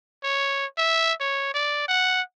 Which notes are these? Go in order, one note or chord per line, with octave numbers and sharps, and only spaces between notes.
C#5
E5
C#5
D5
F#5